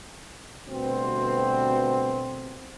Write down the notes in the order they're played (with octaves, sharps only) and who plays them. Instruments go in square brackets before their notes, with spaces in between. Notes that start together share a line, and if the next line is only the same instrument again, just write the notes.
[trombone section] D2 B2 G3 B3 C4